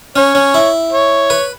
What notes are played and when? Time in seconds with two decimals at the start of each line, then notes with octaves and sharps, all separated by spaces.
0.16 C#4 C#5
0.35 C#4
0.54 E4
0.92 C#5
1.30 B4